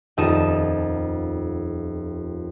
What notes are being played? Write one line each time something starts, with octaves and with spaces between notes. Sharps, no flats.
D#1 F2 D#4 A5 D#6 E7